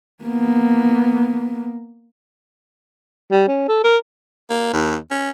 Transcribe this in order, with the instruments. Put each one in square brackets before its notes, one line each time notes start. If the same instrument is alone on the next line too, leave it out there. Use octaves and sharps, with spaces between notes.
[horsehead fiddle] A#3 B3
[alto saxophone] G3
C#4
A4
A#4
[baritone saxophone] A#3
D#2
C#4